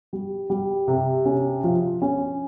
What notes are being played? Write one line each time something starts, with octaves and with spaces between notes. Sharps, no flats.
G3
G3
C3
C#4
F3
C#4